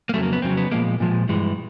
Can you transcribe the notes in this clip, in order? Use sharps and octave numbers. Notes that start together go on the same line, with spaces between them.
A#3
F2 C#3 F#3 A3
A#3
B3
F2 C#3 F#3 C4
B3
A#2 F3 G#3 A#3
A#2 F3 G#3
G2 E3 G#3